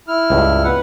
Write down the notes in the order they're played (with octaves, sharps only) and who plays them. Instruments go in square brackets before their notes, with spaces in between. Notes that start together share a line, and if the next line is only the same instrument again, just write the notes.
[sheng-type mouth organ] E4 F6
[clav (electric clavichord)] C#2 G2
[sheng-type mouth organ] B4 F#5